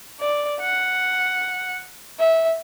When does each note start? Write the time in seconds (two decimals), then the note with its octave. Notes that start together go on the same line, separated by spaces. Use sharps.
0.20 D5
0.60 F#5
2.19 E5